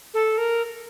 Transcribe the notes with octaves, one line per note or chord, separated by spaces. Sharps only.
A4
A#4